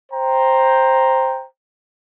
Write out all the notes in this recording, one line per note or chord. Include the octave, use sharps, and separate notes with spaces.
C5 G5 A#5